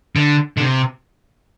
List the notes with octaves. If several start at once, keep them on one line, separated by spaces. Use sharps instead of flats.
D3
D3
C3